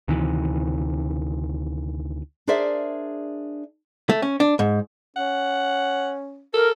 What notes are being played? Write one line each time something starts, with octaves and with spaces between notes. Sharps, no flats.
D2 C3 D#3 E3
D4 G#4 A#4 C5 D5 E5
A3
C#4
D4
G#2
C#4 F#5
A4 A#4